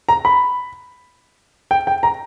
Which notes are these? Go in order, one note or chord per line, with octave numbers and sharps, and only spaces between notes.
A#5
B5
G5
G5
A#5